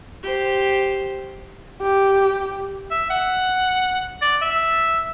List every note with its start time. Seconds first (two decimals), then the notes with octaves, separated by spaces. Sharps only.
0.23 G4 C5
1.82 G4
2.90 E5
3.10 F#5
4.21 D5
4.42 E5